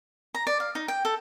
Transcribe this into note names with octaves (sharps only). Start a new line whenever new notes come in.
A#5
D5
F5
D#4
G5
A4